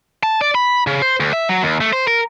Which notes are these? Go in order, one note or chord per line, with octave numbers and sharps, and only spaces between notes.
A5
D5
B5
C#3
C5
D2
E5
F#3
D#2
A3
C5
A#4